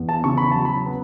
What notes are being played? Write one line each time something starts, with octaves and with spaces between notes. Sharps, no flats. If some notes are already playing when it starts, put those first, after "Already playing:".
Already playing: E2 B3
A5
C#3 C#6
B5
F#3 A5
B5
B3